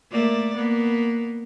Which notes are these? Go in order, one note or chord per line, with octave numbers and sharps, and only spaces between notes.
A3 A#3 D5
A#3 B3